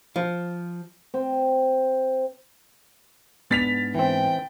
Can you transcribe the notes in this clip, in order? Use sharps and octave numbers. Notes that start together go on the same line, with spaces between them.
F3
C4
G#2 B3 D4 A6 B6 F7
E3 C4 G5